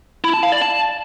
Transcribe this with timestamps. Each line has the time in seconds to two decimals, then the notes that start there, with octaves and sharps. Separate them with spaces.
0.24 E4
0.34 A5
0.43 F5
0.52 D5
0.61 A5